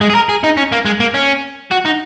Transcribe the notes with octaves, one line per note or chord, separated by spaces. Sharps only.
G#3
G#4
A#4
G#4
D#4
C#4
A#3
G#3
A#3
C#4
F#4
D#4